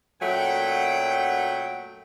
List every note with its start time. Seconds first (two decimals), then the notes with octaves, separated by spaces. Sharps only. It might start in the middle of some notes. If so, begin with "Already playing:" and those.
0.22 F#2 A#2 F#3 A3 F#5 G5